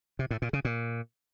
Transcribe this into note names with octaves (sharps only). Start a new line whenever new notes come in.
C3
A2
A#2
C#3
A#2